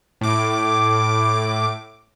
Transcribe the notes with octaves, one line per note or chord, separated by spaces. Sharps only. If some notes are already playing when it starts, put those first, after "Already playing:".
A2 D6